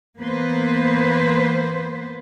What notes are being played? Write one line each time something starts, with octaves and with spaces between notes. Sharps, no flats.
E3 A#3 B3 B4 C5